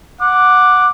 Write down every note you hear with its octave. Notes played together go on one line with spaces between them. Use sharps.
F#5 D6